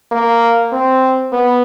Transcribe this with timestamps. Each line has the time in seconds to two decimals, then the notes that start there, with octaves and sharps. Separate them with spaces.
0.12 A#3
0.72 C4
1.33 B3